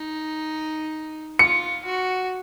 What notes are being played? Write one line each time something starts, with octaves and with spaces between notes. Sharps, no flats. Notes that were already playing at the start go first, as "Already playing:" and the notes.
Already playing: D#4
F4 C#7
F#4